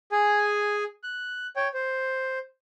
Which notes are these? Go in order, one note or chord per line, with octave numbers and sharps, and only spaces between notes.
G#4 G#5
F#6
C#5 G5
C5